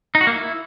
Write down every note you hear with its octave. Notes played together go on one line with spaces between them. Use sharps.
D#4
F#4
A#3
E4